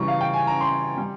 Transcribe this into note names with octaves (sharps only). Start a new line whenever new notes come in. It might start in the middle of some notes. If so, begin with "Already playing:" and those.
Already playing: C#3 E3 G3 A#5 C#6
F5
G5
G#5
A#5
C6
G3